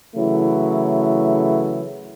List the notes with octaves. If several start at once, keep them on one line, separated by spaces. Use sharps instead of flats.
C#3 E3 F#3 A3 E4